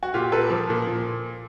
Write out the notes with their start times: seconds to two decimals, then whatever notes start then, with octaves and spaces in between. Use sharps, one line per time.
0.03 F#4
0.14 A#2 F4 G4
0.32 A#3 A4 B4
0.50 F3
0.70 A#2
0.87 A#2